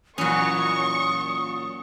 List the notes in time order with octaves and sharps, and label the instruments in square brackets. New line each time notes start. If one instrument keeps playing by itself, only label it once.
[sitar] A#2 E3 [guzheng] F#3 C#4 [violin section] C#6 [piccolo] D#6